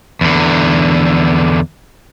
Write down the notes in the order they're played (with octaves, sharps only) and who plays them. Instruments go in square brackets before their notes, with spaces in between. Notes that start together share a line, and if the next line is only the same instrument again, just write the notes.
[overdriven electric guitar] E2 D3